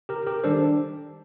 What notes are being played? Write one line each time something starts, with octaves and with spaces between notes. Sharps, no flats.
G4 A#4
G4 A#4
D#3 G3 D4 A4 C5